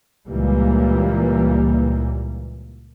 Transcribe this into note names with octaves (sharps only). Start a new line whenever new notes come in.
C#2 A#2 E3 G3 A#3